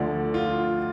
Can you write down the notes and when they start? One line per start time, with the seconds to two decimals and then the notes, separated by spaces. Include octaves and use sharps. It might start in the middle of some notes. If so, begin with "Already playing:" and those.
Already playing: D2 D3 F3 D5
0.34 F4